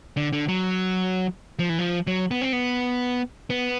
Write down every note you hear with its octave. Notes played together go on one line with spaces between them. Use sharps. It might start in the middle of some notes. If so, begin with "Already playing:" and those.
D3
D3
F#3
F3
E3
F3
F#3
B3
C4
B3
B3